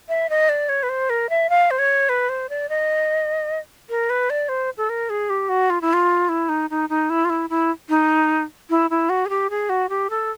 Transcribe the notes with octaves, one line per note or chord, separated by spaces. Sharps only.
E5
D#5
D5
C#5
B4
C5
A#4
E5
F5
C5
C#5
B4
C5
D5
D#5
A#4
B4
D5
C5
A4
A#4
G#4
G4
F#4
F4
E4
F4
E4
D#4
D#4
D#4
E4
F4
E4
E4
D#4
E4
E4
F#4
G#4
G4
G#4
F#4
G4
A4